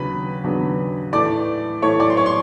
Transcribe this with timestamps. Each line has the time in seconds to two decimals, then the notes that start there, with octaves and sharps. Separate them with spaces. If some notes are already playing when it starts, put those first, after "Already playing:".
Already playing: D#2 C#3 F#3 B3 D4 B4 B5
0.44 D#2 C#3 F#3 B3 D4
1.13 A2 E3 A3 D5 D6
1.82 A2 E3 A3 C#5 C#6
2.00 D5 D6
2.10 C6
2.17 C#5 C#6
2.26 C6